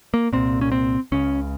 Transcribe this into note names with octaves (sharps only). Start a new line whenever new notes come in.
A#3
C2 A#2 C4
C#4
C4
C#2 C#3 C#4